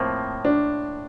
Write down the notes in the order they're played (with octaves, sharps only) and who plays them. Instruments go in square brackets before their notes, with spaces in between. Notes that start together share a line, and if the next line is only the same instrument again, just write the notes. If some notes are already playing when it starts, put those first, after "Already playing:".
Already playing: [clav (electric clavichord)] A2 F3 A#3 [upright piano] C4
[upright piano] D4